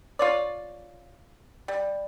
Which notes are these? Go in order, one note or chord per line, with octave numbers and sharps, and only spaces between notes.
F4 C#5 D5
G3